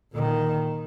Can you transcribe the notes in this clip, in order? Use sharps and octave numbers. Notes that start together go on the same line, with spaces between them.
A#2 D#3